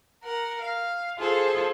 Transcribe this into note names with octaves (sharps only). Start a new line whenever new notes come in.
A#4 F#5
F5
F4 G#4 A4 C5